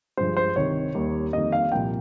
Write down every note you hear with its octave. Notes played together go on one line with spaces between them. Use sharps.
G2 F3 G#3 C5
C5
C2 C3 D#3 C#5
D#2 D#3 G3 A#3
F2 D#3 G3 A#3 D#4 D#5
F5
C2 A#2 F3 A#3 G5